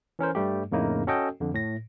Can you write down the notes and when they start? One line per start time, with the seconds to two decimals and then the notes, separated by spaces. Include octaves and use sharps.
0.19 E3 C#4 A#4 C5
0.35 G2 G3 A3 G4
0.72 F2 A2 C#3 A#3 D#4 E4
1.07 C#4 F#4 A4 D#5 G5
1.41 F2 D3
1.53 A2 A#6